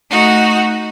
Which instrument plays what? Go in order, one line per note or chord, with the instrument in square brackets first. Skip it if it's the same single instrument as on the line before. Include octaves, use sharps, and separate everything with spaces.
[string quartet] A3 D#4 F#4 F#5